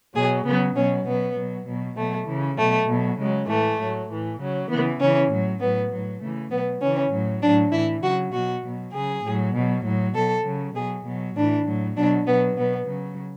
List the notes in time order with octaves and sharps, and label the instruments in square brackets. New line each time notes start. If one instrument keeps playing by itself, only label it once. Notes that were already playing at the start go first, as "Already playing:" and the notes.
[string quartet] B2 F#3 G#4
C#3 F#3 B3
B2 F#3 C#4
B2 F#3 B3
B2 F#3
B2 F#3
B2 F#3 A3
C#3 E3
B2 F#3 A3
B2 F#3
C#3 F#3 G#3
A2 E3 A3
A2 F#3
A2 E3
C#3 F#3
C#3 E3 B3
C#3 E3 C#4
A2 F#3
A2 F#3 B3
A2 F#3
C#3 E3 A3
B2 F#3 B3
C#3 E3 C#4
A2 F#3
A2 F#3 D4
A2 E3 E4
C#3 F#3 F#4
B2 F#3 F#4
B2 F#3
C#3 F#3 G#4
A2 F#3
B2 F#3
A2 F#3
B2 F#3 A4
C#3 F#3
B2 F#3 G#4
B2 F#3
A2 E3 D4
A2 F#3
B2 F#3 D4
B2 F#3 B3
B2 F#3 B3
C#3 F#3